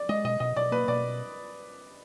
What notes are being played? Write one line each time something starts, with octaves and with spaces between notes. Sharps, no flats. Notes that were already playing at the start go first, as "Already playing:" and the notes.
Already playing: D5
G#3 D#5
B2 D#5
B2 D#5
B2 D5
A#3 B4
B2 D5